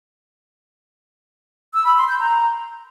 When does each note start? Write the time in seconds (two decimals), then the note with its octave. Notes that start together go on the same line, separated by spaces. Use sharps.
1.74 E6
1.85 B5
1.96 C6
2.08 G6
2.19 A#5